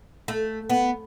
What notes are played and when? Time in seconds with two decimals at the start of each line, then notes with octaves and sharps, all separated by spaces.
0.28 A3
0.69 B3